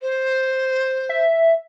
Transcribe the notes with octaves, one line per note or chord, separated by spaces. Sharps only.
C5
E5